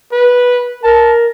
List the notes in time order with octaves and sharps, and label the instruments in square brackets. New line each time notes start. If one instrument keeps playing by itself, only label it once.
[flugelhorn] B4
[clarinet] A#4 [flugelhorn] A5